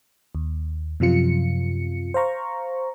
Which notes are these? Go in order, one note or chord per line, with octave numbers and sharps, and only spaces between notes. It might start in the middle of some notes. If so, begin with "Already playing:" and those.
D#2
F#2 C3 F3 F4 C#7
C5 F5 A#5 C#6